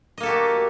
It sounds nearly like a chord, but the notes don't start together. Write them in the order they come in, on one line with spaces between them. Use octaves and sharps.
D#5 A#3 A4 G4 F#4